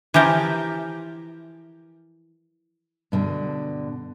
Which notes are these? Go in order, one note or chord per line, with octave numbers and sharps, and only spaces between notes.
E3 F3 G4 A#4
G2 B2 D3